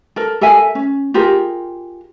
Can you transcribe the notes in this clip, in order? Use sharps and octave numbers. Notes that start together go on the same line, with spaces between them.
A4 A#4
A4 A#4 E5 G#5
C#4
F4 G4 G#4 A#4